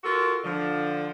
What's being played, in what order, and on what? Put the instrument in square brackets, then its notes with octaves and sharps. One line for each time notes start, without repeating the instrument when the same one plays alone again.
[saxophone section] F4 F#4 A4 A#4
D3 F3